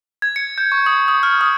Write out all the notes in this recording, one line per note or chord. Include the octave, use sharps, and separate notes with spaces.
G#6
C#7
G6
C#6
D#6
D#6
F6
D#6